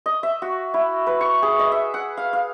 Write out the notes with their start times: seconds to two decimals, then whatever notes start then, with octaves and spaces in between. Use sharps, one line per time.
0.06 D#5
0.23 E5
0.42 F#4
0.74 E4
1.07 B4
1.21 C#6
1.42 G#4
1.59 D#5
1.72 E5
1.94 F#5
2.17 F5
2.33 F5